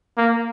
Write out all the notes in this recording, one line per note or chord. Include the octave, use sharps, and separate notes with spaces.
A#3